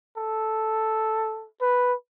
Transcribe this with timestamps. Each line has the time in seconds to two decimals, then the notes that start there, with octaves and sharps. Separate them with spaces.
0.17 A4
1.61 B4